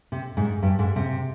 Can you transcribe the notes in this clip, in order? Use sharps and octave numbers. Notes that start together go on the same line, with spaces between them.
C3
G#2
G2
G#2
C3